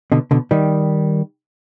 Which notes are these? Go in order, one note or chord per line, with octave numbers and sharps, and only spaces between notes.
B2 D3
B2 D3
D#3 G3